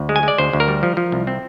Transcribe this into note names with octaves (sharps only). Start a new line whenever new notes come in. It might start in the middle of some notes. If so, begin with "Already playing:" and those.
Already playing: D2
G#3
G#5
G#3 D5
D2 C5
D2
A#4
G3
F3
F3
C2
C4